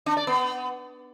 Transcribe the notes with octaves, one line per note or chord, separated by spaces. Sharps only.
D4
D5
B3